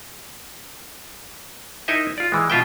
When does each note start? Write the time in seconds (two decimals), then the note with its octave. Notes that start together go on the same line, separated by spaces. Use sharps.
1.88 D#4 E4 A#4 D#5 E5
2.18 F4 D5
2.32 E3 G#3
2.50 B2 F4 E5 G5